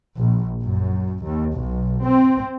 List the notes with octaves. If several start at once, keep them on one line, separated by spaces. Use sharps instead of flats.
A#1
F#2
D#2
B1
C4